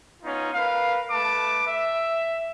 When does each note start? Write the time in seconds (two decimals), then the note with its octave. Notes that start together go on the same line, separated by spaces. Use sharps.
0.23 B3 C#4 D#4 F4
0.54 A#4 B4 F5
1.10 A3 B4 A5 D6
1.67 E5